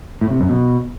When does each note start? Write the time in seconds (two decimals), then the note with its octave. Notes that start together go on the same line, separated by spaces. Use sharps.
0.21 A2
0.31 C3
0.40 F#2
0.49 B2